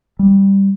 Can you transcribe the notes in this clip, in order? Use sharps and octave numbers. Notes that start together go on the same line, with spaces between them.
G3